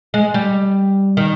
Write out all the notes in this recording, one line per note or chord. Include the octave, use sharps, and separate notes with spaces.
G#3
G3
D#3